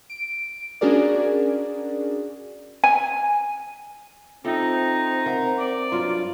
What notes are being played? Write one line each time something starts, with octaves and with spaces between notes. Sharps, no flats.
D7
C#4 D4 F#4 G#4 A#4 D5
G#5
C4 D#4 F4 A4 E5 G5
A#4 E5 F#5 A#5
D5
G2 F#3 F4 C6